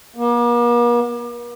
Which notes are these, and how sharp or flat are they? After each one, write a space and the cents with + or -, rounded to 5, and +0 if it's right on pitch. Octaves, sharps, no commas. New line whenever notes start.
A#3 +45